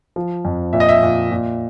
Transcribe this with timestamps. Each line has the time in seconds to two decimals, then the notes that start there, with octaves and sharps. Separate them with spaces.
0.16 F3
0.45 F2
0.73 A#2 E5
0.80 D#5
0.89 E5
1.03 A#2
1.31 A#2